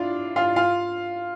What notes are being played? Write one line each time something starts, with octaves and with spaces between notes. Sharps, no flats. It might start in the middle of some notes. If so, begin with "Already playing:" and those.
Already playing: D4 E4 F4 D5 F5
F4 F5
F4 F5